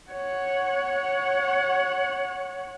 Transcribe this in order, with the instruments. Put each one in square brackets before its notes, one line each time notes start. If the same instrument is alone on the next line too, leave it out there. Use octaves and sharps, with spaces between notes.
[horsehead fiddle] C#5 F#5